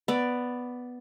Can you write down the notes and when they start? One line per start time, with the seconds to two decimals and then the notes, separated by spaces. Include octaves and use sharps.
0.08 B3 D5